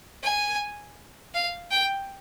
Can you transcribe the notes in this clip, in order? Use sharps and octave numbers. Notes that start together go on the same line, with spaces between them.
G#5
F5
G5